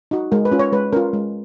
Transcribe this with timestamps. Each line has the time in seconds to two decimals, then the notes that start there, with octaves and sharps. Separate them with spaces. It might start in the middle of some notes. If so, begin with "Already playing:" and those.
0.11 D#4 F#4
0.32 G#3 A#4
0.45 B4
0.52 C#4 F4
0.59 C#5
0.72 G#3 B4
0.93 C#4 F4 A#4
1.13 G#3